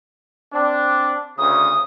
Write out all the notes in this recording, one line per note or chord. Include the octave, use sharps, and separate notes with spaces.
C4 D4
D2 C#3 D#6